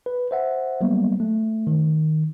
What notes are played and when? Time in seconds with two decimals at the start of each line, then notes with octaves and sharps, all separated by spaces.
0.06 B4
0.31 C5 E5 F#5
0.81 F#3 G3 A#3 B3
1.20 A3
1.67 D#3